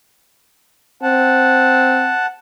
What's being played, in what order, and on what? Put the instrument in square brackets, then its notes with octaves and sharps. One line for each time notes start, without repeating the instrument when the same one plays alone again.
[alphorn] C4 [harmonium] F#5 A5